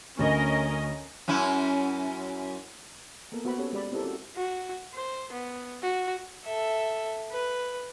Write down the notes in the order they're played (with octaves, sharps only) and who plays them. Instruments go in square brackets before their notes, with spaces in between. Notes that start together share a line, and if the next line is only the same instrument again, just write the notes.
[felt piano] D2 [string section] C#4 A#4 D#5
[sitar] F#2 C#4 E4
[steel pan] A#3 B3 A4 A#4
B3 F#4 C5 F#5 B5
C4 C#4 G4 A4 C#5
G#3 G4 D5 B5
C4 D#4 E4 G4 A4 A#4
C4 C#4 F#4 A4
[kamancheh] F#4
C5
B3
F#4
[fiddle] A4 E5
B4